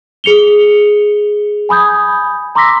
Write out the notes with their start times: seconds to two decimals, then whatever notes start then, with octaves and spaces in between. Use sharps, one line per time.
0.24 G#4 C#7 F7 G7
1.69 G#5 B5 D#6 G6 G#6
2.55 A#5 C6 D6 E6 A#6 B6